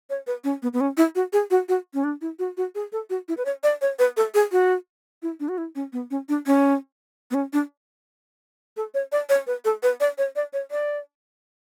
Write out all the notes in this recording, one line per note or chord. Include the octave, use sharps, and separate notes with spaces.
C#5
B4
C#4
B3
B3
C#4
E4
F#4
G#4
F#4
F#4
C#4
D4
E4
F#4
F#4
G#4
A4
F#4
E4
B4
C#5
D5
C#5
B4
A4
G#4
F#4
E4
D4
F#4
E4
C#4
B3
C#4
D4
C#4
B3
C#4
D4
A4
C#5
D5
C#5
B4
A4
B4
D5
C#5
D5
C#5
D5